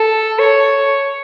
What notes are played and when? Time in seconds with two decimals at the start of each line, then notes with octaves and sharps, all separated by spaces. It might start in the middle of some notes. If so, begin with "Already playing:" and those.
Already playing: A4
0.39 C#5